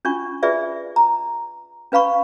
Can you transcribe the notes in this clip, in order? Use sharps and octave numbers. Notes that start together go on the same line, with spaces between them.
C#4 D4 F4 C#6
F4 G#4 B4 D5 E5
A#5
C#4 B4 F5 B5 C#6